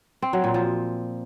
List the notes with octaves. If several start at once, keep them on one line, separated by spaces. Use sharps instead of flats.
C4
F#3
A#2
F3